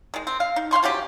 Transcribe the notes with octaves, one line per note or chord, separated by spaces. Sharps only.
D#3 G#3
C4
F5
D#4
F5 G5 C6 C#6
F3 F#3 C#4 G4